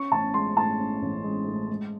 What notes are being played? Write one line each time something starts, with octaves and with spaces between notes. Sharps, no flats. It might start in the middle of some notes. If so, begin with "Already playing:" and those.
Already playing: C#4 C#6
A1 A5
G#3 C6
A2 A5
C#4
A1
G#3
A2
G#3